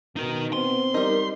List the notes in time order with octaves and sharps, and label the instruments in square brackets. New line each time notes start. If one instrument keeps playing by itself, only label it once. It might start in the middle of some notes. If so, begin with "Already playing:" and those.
[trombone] B2 [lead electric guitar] D#4 A#4
[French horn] B3 [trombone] C4 [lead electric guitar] C6
[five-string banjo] G3 D#4 [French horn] A#4